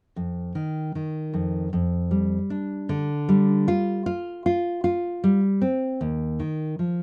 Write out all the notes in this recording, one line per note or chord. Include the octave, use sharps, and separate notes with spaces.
F2
D#3
D#3
F2
F2
G3
D4
D3
G3
F4
F4
F4
F4
G3
C4
D#2
D#3
F3